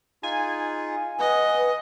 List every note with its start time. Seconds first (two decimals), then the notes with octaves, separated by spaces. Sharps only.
0.23 D#4 F4 G#4 G#5
1.20 B4 D#5 F#5